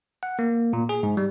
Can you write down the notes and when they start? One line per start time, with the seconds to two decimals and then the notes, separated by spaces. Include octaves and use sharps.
0.23 F#5
0.39 A#3
0.73 A#2
0.89 G#4
1.03 G#2
1.17 G3